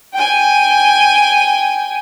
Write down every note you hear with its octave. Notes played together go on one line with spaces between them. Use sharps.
G5 G#5